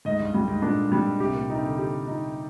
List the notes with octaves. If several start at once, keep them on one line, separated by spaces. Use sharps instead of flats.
G#2 D#5
G2
G2 G3
G#2
A#2 D4
G3
C3 G4
A#2
C3 D#4
D3
G4
D#4